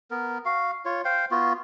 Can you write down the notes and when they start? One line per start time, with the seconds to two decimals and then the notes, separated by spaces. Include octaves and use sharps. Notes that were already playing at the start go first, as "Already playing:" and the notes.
0.11 B3 A#4
0.45 F#4 F5
0.85 F4 C#5
1.05 C5 F5 G5
1.31 B3 F4 F#4